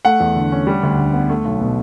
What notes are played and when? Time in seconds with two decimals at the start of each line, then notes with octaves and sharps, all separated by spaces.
0.05 A3 F#5
0.20 E2
0.36 D3
0.52 C#4
0.67 G3
0.83 D2
0.99 D3
1.14 B3
1.30 A3
1.45 B1
1.60 B2